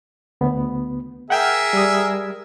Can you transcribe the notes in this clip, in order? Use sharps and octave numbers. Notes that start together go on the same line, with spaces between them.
D2 B3
G#4 A#4 E5 F#5 G5 F6
G3 D#6